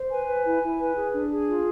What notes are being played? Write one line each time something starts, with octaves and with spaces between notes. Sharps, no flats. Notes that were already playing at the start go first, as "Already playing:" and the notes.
Already playing: C5
B4 G#5
B4
E4
E4
B4
G#4
D4
G#4
F4